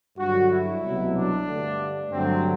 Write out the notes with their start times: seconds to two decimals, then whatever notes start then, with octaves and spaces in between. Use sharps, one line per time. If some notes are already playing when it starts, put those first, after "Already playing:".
0.17 G2 D3 F#3 F#4
0.50 E4
0.82 C2 B2 F#3 A3
1.15 D4
1.46 G2 D3 A3
2.10 G2 D3 F#3 A3 C4